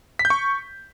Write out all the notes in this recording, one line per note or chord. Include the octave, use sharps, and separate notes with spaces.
B6
G6
C#6